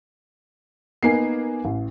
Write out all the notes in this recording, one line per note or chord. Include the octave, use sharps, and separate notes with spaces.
A#3 B3 D#4 G#5 C7
A1